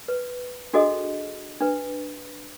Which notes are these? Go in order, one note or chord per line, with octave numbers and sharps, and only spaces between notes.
B4
D4 F#4 G#4 A4 D#5
D4 B4